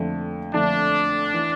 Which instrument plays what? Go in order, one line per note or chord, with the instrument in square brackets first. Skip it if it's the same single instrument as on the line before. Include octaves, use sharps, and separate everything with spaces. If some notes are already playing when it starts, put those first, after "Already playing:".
Already playing: [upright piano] F2 D3 A3
[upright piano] F2 D3 A3 [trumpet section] D4
[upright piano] E3